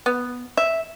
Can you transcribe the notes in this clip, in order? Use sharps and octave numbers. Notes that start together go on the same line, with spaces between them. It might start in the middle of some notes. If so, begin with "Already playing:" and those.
B3
E5